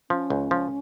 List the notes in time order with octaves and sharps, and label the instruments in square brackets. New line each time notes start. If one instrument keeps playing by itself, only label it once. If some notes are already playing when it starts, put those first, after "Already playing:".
[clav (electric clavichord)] F3 [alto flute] C#4
[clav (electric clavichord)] C#2
F3